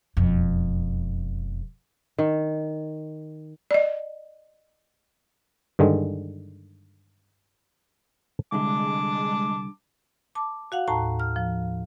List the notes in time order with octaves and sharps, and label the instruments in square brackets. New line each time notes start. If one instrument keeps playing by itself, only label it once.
[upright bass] E1 F2
[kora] D#3
[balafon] D5 D#5
[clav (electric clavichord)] G2 D3 D#3 G#3
[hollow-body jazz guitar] C2 D3 [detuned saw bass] G#3 [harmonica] A5 D6
[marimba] A5 D6
F#4 F5 F#5
D#2 A2 A5 A#5
F6
F3